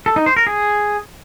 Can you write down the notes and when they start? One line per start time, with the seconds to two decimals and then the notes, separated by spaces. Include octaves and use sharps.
0.06 A4
0.16 D#4
0.26 C5
0.36 A#4
0.47 G#4